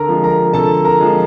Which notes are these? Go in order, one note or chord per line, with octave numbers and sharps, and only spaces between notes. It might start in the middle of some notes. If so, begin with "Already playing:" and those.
Already playing: D3 A4 A#4 A#5
F3 G#3
A#4 A#5
D3 A4 A5
A#4 A#5
F3 G#3